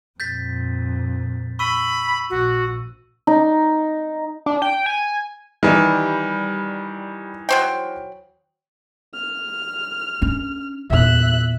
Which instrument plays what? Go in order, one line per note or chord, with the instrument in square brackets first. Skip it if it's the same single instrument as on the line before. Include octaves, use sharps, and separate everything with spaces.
[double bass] F2 A#2 [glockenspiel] G6 A6 B6
[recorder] B5 [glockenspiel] C#6 E6 D#7
[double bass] A#1 [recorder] F#4
[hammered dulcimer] D#4
[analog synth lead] D4
G5
G#5
[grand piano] D#3 E3 [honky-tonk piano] G3
[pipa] F#3 C5 G5
[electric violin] F6
[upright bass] C#4 D4
[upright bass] E2 A#2 [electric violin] E5 F#6